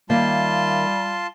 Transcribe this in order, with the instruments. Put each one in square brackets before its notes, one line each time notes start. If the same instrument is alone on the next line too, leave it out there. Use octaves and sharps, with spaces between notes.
[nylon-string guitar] D#3 A#3 E5 [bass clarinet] G3 [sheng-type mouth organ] F4 A5 C6